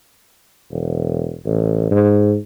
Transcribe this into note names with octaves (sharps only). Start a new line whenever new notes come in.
E1
A1
G#2